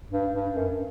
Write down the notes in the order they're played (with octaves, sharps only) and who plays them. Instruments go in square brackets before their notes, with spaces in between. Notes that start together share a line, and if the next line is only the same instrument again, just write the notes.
[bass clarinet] G2
G2
F#2